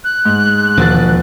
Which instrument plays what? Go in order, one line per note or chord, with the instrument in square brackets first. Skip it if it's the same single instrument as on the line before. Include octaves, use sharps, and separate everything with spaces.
[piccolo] F#6
[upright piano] G#2
[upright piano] E1 A6 [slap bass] D#2 F3